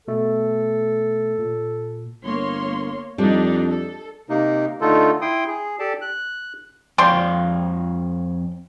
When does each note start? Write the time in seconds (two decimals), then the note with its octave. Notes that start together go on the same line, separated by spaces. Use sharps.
0.08 B2 A3 A4
1.39 A#2
2.24 G1 A#3 C#5 C6
3.18 F2 G3 D4 D#4
3.69 A4
4.29 C3 A#3 D#4
4.81 D3 A3 D#4 F4 A4
5.21 E4 G5 C6 D#6
5.47 G#4
5.79 G4 A4 D5 A5
6.01 F#6
6.98 F2 C#5 D5 F5 G5 C6